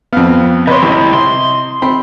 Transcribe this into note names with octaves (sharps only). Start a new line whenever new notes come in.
F2 B3 C4 F5
C3 B4 C#5 D#5 C6
A1 C4 E4
C3 C6
C4 B5